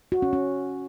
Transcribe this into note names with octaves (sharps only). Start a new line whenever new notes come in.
F#4
C#4
C#4